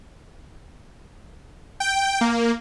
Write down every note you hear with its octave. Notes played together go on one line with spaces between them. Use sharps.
G5
A#3